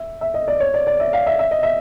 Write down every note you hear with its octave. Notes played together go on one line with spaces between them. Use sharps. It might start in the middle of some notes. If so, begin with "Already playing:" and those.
Already playing: E5
E5
D#5
D5
C#5
D5
D5
E5
F5
E5
E5
D#5
E5